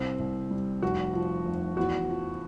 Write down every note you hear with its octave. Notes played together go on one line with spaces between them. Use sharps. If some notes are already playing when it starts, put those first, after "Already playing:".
Already playing: C2 C4
C2
G3
F1 F#4
F3
F1
E2 F#4
F3